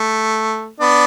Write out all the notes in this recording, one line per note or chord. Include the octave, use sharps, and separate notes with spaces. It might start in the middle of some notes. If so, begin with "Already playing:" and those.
Already playing: A3
B3 D4